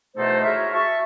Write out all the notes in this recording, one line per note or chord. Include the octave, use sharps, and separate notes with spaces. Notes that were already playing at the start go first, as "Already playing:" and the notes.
E2 B2 A3 D#4 A4 C5
E4 F#4 G#4 A#4 C#5 E5
E5 A5 C#6